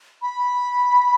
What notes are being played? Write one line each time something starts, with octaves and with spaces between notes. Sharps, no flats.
B5